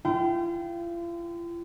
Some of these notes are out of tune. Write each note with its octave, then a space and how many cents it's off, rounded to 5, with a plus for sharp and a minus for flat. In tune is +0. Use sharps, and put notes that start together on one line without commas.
F4 -40 G5 -20